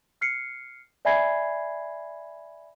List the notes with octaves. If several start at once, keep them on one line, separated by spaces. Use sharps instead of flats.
F6 C7 C#7
D5 E5 G#5 B5 G#6 C7